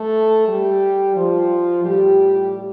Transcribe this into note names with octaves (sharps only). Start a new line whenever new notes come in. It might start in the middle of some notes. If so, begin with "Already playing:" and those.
Already playing: A3 A4
G3 G4
F3 F4
A2 G3 G4